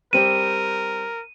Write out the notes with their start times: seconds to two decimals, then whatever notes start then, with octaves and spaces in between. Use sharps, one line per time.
0.13 G3 C4 G4 A#4 D#7